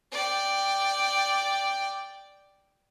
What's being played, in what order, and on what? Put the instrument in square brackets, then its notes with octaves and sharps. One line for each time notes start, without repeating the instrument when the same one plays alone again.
[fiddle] D5 G5